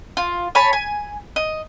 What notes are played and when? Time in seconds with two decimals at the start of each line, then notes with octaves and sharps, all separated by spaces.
0.17 F4
0.55 C#5 G#5 A5 B5
0.73 G#5
1.36 D#5